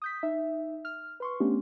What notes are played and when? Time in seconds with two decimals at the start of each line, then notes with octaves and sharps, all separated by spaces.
0.02 D#6 G6 B6
0.23 D#4 E5
0.85 F6
1.20 B4 C6 C#6
1.40 A3 B3 C#4 D4 G4